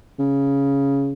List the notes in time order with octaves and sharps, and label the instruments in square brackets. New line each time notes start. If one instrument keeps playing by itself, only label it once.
[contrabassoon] C#3